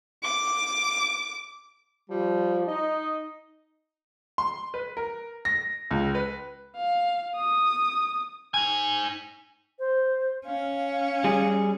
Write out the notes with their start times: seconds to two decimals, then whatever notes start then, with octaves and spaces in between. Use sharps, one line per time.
0.23 D6
2.10 F3 G3
2.67 D#4 D#5
4.38 C6
4.74 B4
4.97 A#4
5.45 A#6
5.91 C#2
6.15 B4
6.77 F5
7.37 D#6
8.54 D#4 G#5
9.79 C5
10.45 C#4 F5
11.24 G3 G#4